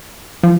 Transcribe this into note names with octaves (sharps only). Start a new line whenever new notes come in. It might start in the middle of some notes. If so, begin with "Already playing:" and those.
F3